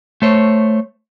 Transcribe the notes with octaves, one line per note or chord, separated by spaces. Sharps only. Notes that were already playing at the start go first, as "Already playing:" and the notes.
A3 C5 C#5